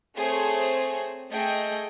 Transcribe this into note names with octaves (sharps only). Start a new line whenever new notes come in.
A3 C4 G#4 C5 C#5
A3 G#4 D#5 G5